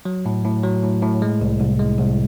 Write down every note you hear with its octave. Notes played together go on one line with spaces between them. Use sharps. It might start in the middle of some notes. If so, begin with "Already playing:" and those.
F#3
A2
A2
F#3
A2
A2
G#3
C2
C2
G#3
C2